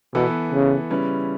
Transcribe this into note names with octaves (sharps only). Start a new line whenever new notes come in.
B2 E3 B3 E4 A4
C#3
C#3 G3 C#4 E4 B4